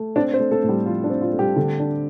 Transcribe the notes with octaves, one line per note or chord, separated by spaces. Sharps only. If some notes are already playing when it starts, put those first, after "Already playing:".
Already playing: A3
C4 D4 D5
C4 C5
A3
A3 A4
A2
G3 G4
F3 F4
D4
C4
F4
A3
G3 G4
D3
D4